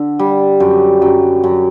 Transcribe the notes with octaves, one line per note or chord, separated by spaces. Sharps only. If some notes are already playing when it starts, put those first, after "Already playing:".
Already playing: D3
G3
F#2
F#2
F#2